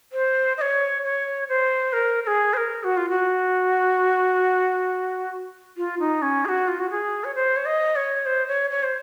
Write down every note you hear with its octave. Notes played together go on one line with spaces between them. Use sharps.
C5
D#5
C#5
C#5
C5
A#4
A#4
G#4
C5
A#4
F#4
F4
F#4
F4
D#4
C#4
G#4
F#4
F4
F#4
G#4
C#5
C5
C#5
D#5
C#5
C5
C#5
C#5
C5